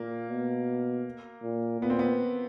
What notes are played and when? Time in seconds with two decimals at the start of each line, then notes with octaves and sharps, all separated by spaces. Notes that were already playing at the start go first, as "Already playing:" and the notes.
Already playing: A#2 A#3
0.29 B2
1.43 A#2
1.81 A#2 B3
1.90 C4
1.99 B3